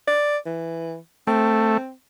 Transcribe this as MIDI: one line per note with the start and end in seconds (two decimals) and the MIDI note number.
0.08 0.38 74
0.46 0.97 52
1.27 1.77 57
1.27 1.92 60